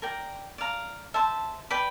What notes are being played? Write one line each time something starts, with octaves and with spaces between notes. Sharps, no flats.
A#4 D5 G5 A#5
D5 F5 A#5
C5 E5 A5
B4 D5 G5 B5